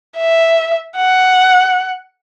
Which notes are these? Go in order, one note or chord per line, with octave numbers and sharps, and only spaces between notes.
E5
F#5